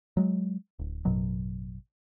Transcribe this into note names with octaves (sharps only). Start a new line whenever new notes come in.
F#3 G#3
D1
A1 F#2 B2 F#3